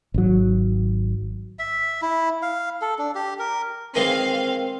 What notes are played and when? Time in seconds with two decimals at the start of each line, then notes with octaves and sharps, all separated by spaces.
0.14 G#1 F#3
1.59 E5
2.02 E4
2.42 F5
2.82 A4
2.98 D4
3.15 G4
3.39 A#4
3.95 D#3 E3 G#3 C4 F5